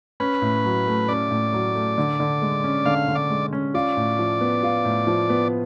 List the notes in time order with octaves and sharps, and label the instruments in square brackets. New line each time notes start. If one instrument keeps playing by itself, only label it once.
[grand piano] C#4 [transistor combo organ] B4
[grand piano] A2
F#3
A3
[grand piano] C#4 [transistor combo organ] D5
[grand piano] A2
F#3
A3
D3
D3
G#3
C#4
[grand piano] D3 [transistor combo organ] F5
[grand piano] D3
[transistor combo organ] D5
[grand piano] G#3
C#4
[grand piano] F4 [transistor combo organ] D5
[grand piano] A2
F3
B3
F4
A2
F3
B3